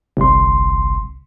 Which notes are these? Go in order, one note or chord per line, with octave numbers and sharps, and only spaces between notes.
G1 C2 C6